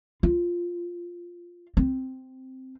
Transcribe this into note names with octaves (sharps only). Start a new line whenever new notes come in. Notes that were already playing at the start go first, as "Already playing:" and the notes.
F4
C4